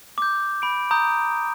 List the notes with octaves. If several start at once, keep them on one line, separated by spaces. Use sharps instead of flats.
D6 G6
B5 D7
A#5 D#6 G6